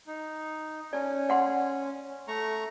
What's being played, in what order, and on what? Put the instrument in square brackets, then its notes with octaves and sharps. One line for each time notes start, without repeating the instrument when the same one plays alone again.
[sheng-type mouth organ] D#4
[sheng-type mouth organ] C#4 [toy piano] D5
[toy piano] D5 F#5 C6
[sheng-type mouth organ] A3 A#5 C#6